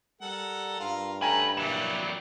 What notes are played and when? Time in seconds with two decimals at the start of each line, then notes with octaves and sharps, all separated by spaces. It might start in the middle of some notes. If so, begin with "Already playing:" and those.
0.21 G3 A4 A#4 F#5
0.80 G2 F4 A#4 F5
1.21 A3 C#4 B4 G5 G#5 A#5
1.57 F#3 G3 A#3 E4 G4 E7